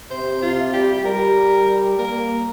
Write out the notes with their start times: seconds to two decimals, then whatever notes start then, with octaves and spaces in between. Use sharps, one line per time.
0.10 C3 C5
0.41 C3 F4
0.73 G3 G4
0.93 G4
1.05 G3 A#4
1.99 A#3 A#4